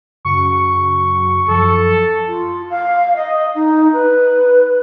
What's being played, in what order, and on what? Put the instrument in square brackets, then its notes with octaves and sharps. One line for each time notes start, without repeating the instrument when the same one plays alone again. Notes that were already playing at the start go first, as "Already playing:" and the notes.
[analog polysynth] F#2 C#3 F#4 [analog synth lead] C#6
[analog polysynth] F#2 F3 [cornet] A4
[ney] F4
F5
D#5
D#4
B4